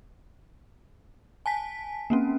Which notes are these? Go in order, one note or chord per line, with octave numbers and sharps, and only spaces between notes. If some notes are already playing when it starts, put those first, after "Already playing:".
G#5 A5 B6
A#3 C4 C#4